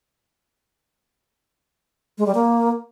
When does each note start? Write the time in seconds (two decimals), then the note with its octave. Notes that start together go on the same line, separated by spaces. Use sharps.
2.18 G#3
2.26 G3
2.35 A#3